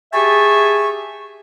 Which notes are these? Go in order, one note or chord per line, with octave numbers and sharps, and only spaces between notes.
G4 G#4 E5 G#5 A5 C#6